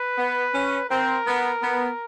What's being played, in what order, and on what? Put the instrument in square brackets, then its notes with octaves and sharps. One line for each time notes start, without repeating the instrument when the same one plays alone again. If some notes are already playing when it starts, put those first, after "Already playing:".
Already playing: [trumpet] B4
[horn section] B3
C#4
[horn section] C4 [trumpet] A#4
[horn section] B3
B3